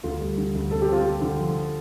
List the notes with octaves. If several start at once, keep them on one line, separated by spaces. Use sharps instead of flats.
D2 F4
G3
D3
D2
C4 A4
G4
C4 F4 A4
C4
D3
F3